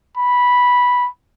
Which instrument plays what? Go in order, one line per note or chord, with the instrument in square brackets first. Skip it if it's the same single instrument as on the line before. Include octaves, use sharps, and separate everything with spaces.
[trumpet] B5